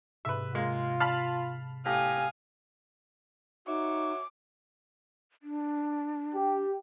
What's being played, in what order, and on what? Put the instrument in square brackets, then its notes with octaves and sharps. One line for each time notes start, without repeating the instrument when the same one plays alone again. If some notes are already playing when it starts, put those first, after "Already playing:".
[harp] G#2 C3 [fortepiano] B4 E5
[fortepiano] G#3 A#3 [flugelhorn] F4
[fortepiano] F5 A5 B5
[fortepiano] A2 [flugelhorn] G4 [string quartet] F5 G#5 D#6
[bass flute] D#4 [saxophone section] F#4 C#5 E5 [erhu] D6
[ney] D4
[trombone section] G4